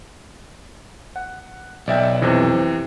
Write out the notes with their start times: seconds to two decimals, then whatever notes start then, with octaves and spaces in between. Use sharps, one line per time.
1.16 F#5
1.88 B1 D5 E5 G5
2.22 F2 C3 E3